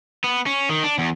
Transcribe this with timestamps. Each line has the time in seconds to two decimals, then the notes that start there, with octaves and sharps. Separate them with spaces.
0.24 B3
0.46 C#4
0.70 D#3
0.83 D4
0.99 E2